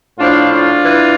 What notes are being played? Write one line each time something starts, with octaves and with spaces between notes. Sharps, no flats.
A2 F3 D4 F4
D4 F4
E3